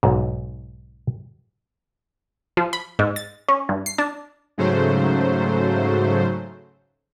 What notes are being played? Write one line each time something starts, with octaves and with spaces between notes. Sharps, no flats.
B1 G#2
F3
B5
G#2
A6
C#4
G2
C7
D4
G#2 C#3 F#3 A3 C5